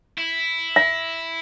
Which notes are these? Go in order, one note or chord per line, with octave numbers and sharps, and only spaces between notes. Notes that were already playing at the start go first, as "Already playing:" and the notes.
E4
E5